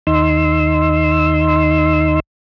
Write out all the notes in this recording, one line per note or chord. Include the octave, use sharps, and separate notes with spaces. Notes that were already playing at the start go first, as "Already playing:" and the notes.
D#2 D#4 C6 E6